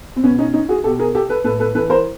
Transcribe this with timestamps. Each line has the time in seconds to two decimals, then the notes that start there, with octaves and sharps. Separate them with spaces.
0.16 C4
0.23 B2 B3 C#4
0.39 C#4 D#4
0.54 C#4 D#4
0.69 F#4 G#4
0.84 B2 G4 A4
0.99 G#4 A#4
1.15 G4 A4
1.30 A4 B4
1.44 A2 A4 B4
1.60 A4 B4
1.75 E3 A4 B4
1.90 A#4 C5